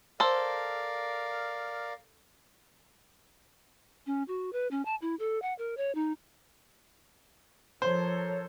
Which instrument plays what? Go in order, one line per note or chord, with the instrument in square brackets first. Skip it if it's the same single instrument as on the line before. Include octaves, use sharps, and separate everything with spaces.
[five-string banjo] A4 C5 [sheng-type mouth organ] A#4 D5 F5
[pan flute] C#4
F#4
B4
C#4
A5
E4
A4
F#5
A#4
C#5
D#4
[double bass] F3 [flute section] A4 A#4 C#5 [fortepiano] C5